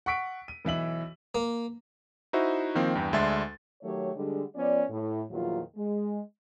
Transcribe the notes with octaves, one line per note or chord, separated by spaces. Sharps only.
F#5 C#6 B6 D7
D#7
B1 E3 E5 F#7
A#3
D#4 E4 F#4 C5 E5
D#3 F3 A#3 C4
E2 G2 G5
D2 G#3 D4 E5 C6 A6
D#3 F#3 A3 G4 C#5
D3 G3 G#3
F3 B3 C#4 D5
A2
E2 A#2 D#3 F3 F#3 F4
G#3